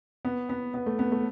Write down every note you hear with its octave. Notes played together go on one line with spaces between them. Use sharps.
B3
B3
B3
A3
B3
A3